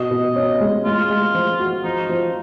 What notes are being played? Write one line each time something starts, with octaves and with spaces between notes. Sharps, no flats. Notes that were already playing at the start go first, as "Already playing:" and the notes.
Already playing: B2 D#5
B2
C#4
G#3
G#3 F4
G#3
F3
F#4
F3 D#4
F3